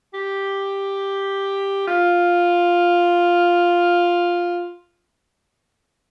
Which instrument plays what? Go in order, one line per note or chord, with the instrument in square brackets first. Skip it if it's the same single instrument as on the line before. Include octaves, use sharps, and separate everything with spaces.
[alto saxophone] G4
F4